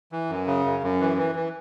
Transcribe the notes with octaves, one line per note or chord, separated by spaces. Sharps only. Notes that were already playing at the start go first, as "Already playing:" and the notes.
E3
F#2
C#3
F#2
F#2
E3
E3
E3